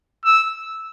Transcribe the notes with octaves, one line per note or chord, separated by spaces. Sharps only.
E6